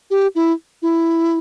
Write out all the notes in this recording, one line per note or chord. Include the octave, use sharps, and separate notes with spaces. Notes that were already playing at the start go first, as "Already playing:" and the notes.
G4
E4
E4